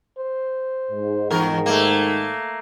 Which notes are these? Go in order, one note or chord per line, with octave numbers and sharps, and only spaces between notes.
C5
G#2
E2 D#3 A#4
A3 A#3